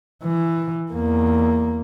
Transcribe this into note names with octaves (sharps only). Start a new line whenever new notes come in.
E3
E2 A#3